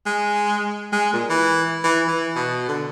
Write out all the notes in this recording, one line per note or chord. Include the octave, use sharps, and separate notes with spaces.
G#3
G#3
A#2
E3
E3
E3
B2
D3